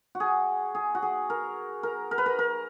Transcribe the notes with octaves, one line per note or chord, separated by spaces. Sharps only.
F#4
G#4
G#4
F#4
G#4
A#4
A#4
A#4
B4
A#4
A#4